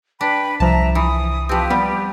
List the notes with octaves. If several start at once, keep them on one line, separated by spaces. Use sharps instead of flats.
D4 B4 G5 B5
C2 F3 E5 A5 A#5
E3 D#6
F3 C4 G4 B4
G3 B3